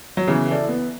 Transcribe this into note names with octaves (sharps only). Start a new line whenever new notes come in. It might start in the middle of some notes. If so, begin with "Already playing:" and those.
F#3
C#3 E3 B3
E4 A4 D5
B3